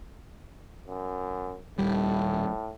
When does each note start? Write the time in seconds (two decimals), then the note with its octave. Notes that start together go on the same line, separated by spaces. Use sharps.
0.88 F#2
1.78 D#1 A2 G3